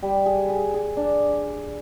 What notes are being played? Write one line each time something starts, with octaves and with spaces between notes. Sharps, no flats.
G3
G#4
G#4
G#4
D4